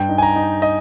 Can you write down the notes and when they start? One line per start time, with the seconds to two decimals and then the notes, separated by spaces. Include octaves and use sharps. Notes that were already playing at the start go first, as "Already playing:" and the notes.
Already playing: G2 G5
0.09 D#4
0.18 G#5
0.23 A#5
0.36 D#4
0.62 D#5